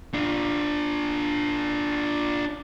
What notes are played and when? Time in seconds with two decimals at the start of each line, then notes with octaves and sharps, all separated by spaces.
0.14 D4 F4